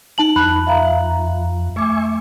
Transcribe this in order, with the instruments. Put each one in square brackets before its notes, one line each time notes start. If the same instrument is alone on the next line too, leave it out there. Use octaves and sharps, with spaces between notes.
[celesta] D#4 A5 F#7
[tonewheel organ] F2 [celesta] B5 [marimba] F#6
[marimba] E5 F5 A#5
[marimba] A3 D6 [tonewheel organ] E5 G#5 C#6